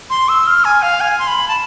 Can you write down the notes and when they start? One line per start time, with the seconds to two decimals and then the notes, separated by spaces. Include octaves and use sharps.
0.10 C6
0.29 E6
0.47 F6
0.65 G#5
0.82 F5
1.00 G#5
1.19 C6
1.28 B5
1.48 A5